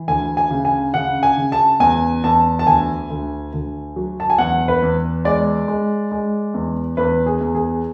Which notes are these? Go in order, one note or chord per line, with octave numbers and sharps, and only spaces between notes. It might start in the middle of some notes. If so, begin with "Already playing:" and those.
Already playing: E3
D2 G#5
G#5
C#3
G#5
C#3 F#5
G#5
C#3
A5
E2 G#5
E2 A5
A5
D2 G#5
D2
D2
F#3
A5
G#5
E2 F#5
B4
E2
G#3 D5
G#3
G#3
E2
E2 B4
G#4
E2
G#4